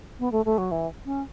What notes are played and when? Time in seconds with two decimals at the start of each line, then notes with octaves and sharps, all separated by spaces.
0.19 B3
0.32 A3
0.46 A3
0.58 F#3
0.71 E3
1.06 C#4